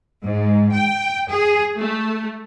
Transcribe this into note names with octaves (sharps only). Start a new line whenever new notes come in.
G#2
G5
G#4
A3